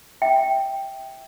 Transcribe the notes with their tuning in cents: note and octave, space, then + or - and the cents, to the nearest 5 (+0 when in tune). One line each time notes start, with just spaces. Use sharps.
E5 -10 G5 +0